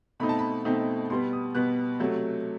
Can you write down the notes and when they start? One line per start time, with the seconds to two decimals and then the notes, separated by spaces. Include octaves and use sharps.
0.20 B2 A3 C4 D#4 B5
0.29 A5
0.39 B5
0.65 B2 A3 C4 D#4
1.10 B2 G3 B3 C6
1.33 D#6
1.55 B2 G3 B3 F#6
2.00 C3 F#3 A3